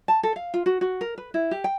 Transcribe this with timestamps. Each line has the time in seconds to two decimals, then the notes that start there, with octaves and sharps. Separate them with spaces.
0.08 A5
0.23 A4
0.36 F5
0.54 F4
0.66 F#4
0.81 F#4
1.01 A#4
1.18 B4
1.34 E4
1.51 G4
1.64 G5